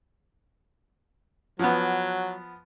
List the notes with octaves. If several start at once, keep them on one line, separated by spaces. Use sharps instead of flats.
F3 F#3 B3